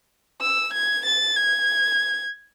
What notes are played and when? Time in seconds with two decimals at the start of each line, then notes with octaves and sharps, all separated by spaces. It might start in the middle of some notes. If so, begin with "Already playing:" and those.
0.41 E6
0.74 G#6
1.06 A6
1.37 G#6